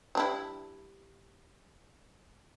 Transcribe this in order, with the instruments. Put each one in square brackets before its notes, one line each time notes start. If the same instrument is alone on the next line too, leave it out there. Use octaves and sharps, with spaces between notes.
[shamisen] G3 D4 E4